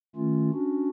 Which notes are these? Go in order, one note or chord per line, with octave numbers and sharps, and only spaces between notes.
D#3 A3 C#4 F4
C#4 D4 F#4